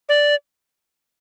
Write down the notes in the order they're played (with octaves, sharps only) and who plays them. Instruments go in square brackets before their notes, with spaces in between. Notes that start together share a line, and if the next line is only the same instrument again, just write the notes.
[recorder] D5